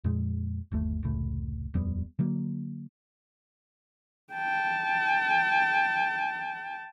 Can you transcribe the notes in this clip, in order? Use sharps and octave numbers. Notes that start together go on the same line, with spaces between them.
F2 A#2 G#3
G1 D#2 A3
F1 C#2 A2
D#1 F2 G3 B3
D3 F#3 A#3
G5 A5